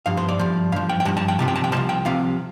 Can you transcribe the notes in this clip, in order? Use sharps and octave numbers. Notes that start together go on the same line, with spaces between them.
G2 F3 F5
C5
D5
G2 F3
G2 F3 F5
G5
G5
G2 F3 A5
A5
G5
C2 C3 F3 A5
G5
A5
G5
C2 C3 F3 A5
G5
C2 C3 F3 F5